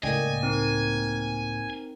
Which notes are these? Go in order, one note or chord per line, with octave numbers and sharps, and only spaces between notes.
C#2 A2 A#3 D5 D#5 G5 G#5
C4 D#4 A#4